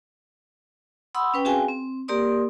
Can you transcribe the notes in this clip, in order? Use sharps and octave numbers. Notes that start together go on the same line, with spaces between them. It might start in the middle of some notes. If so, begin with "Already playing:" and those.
F#5 B5 C6 D#6 E6
C#4 B4 G5
C4 F#4 G#4 F5 G5 G#5
C4
A#3 G4 A#4 D5 C6 D#6